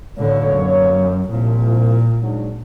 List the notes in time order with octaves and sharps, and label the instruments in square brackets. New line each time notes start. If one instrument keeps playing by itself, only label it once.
[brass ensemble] B1 A#3 C#5 [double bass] A2 D3
[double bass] F#2
[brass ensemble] C2 F3 [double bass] A#2
[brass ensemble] G#2 F#3 D4